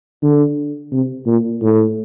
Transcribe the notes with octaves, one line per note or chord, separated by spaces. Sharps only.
D3
C3
A#2
A2